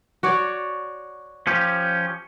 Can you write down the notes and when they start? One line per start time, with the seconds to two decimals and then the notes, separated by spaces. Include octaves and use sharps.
0.23 F#4 C#5 D5
1.47 F3 C#4 G4